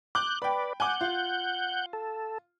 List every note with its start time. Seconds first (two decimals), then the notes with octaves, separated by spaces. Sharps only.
0.15 D6 F#6 G6
0.42 B4 D5 G5 B5
0.80 F#5 G#5 D6 G6
1.01 F4
1.93 A4